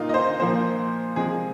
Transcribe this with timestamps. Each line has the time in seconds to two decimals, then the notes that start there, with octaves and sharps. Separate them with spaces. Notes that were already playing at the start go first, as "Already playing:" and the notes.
Already playing: A#2 A#3 D#4 F4
0.09 D#5
0.14 C5
0.40 A#2 F3 A#3 C5
1.16 C3 F3 G#3 G#4